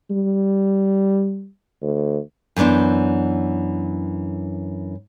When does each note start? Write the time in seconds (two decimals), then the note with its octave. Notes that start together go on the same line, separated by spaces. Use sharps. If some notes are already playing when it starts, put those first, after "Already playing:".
0.10 G3
1.82 D2
2.56 F#2 E3 B3 D4 C5